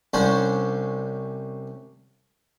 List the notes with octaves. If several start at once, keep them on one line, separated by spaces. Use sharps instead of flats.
C2 C#4 D4 C5